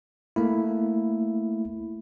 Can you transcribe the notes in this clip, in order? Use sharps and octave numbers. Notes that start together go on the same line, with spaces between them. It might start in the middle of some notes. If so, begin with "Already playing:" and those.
A3 A#3 E4